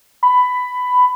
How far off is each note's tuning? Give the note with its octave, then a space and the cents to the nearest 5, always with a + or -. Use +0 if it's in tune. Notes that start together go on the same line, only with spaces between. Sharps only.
B5 +15